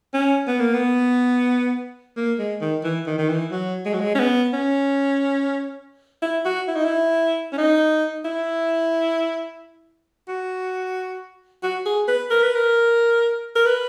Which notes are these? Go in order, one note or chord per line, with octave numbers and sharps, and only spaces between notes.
C#4
B3
A#3
B3
A#3
G#3
D#3
E3
D#3
D#3
E3
F#3
G#3
F#3
G#3
C#4
B3
C#4
E4
F#4
E4
D#4
E4
C#4
D#4
E4
F#4
F#4
G#4
B4
A#4
B4
A#4
A#4
B4